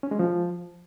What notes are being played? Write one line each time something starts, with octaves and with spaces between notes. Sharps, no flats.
C#4
G#3
F3